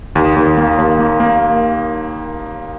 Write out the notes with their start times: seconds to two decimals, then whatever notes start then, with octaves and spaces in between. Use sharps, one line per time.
0.15 D#2
0.36 D#2
0.57 A#3
0.78 D#2
0.99 A#3
1.20 A#3